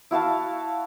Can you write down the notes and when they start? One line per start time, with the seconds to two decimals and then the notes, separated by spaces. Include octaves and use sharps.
0.11 E4 F#4 F5 A5